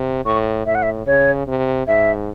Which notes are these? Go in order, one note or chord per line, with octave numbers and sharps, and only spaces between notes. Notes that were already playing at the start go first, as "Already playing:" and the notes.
Already playing: C3
A2 C#6
A2 E5
F#5
E5
C#3 C#5
C3
G#2 E5